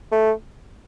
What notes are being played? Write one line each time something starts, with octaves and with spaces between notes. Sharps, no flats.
A3